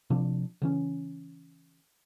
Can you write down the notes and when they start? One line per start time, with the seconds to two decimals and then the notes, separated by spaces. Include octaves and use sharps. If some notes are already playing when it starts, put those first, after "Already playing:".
0.10 C3 F3 D4
0.62 C#3 E3 C#4